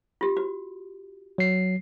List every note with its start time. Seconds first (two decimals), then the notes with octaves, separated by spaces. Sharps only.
0.21 F4 G4
0.37 F#4
1.38 F#3 C7